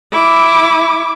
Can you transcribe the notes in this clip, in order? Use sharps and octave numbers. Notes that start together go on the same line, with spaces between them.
E4 D6